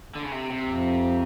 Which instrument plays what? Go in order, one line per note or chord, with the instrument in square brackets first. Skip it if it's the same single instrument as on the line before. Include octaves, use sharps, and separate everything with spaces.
[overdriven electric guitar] D3
C#3
C3
C3
[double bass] F2